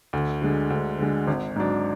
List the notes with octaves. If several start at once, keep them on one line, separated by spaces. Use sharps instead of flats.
D2
D3 G#3
D2
D3 G#3
G#1
G#2 F#3 D4